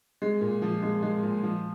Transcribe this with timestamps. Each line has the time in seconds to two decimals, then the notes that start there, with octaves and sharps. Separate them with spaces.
0.22 G#3
0.41 A#2
0.62 F3
0.82 G#3
1.03 G#3
1.23 A#2
1.43 F3